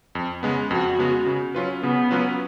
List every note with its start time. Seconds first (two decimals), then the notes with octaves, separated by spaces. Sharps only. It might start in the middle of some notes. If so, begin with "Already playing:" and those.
0.15 F2
0.43 C#3 G#3 B3
0.71 F2 F#4
0.99 C#3 G#3 B3
1.26 C#3
1.55 F#3 C#4 F4 B4
1.82 C#3 B3
2.11 F#3 C#4 F4 B4